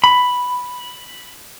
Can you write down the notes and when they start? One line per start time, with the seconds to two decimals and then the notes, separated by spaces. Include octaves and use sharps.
0.04 B5